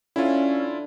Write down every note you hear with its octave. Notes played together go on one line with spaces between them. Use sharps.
D3 C#4 E4 F4